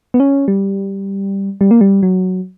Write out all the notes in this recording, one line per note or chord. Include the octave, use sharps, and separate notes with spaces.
B3
C#4
G3
G3
A#3
G3
F#3